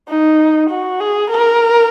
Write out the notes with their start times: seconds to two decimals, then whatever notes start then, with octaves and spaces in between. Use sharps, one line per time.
0.09 D#4
0.70 F#4
1.00 G#4
1.30 A#4